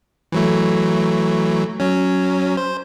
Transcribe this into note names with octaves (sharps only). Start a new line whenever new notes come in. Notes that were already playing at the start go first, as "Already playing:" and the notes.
E3 F#3 A3
F#3 C#4
C5